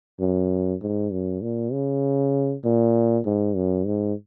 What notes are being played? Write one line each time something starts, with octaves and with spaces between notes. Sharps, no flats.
F#2
G#2
F#2
A#2
C#3
A#2
G#2
F#2
G#2